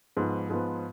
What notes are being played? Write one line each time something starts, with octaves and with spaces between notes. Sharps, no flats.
G#2 F3 B3
G#2 F3 B3